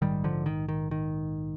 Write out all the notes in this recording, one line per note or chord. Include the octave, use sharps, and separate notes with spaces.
A#1 G#2 D#3 G3
D3 F3
D#3
D#3
D#3